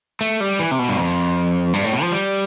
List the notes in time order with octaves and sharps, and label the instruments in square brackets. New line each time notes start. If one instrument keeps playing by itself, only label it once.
[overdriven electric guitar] A3
G3
E3
C3
B2
G2
F2
G2
A2
B2
F3
G3